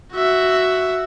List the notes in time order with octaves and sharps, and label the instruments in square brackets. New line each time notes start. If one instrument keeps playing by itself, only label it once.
[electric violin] F#4 E5